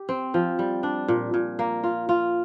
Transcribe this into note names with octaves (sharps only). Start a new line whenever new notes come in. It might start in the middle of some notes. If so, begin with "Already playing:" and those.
Already playing: G4
C4
F3
G3
D4
A#2
A#2
A#3
F4
F4